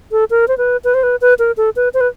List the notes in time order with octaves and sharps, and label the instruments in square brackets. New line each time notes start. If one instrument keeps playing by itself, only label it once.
[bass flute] A4
A#4
C5
B4
B4
C5
B4
B4
A#4
A4
B4
C5
B4